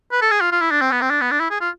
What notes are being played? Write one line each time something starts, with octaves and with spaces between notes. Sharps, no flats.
B4
A4
G#4
F4
F4
E4
D4
C4
B3
C4
D4
B3
D4
E4
G#4
F4